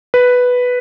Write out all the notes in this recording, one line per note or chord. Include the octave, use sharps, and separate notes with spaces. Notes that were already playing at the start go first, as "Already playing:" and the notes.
B4